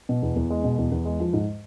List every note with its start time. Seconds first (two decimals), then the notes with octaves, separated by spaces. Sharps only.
0.09 B2
0.22 E2
0.36 E2
0.50 G#3
0.64 B2
0.78 E2
0.92 E2
1.05 G#3
1.20 F3
1.33 G#2